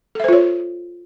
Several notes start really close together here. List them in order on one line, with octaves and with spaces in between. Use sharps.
A4 E5 C5 F4 C#5